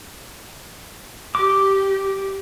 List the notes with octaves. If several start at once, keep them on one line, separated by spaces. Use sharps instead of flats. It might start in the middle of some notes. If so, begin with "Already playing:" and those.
G4 D6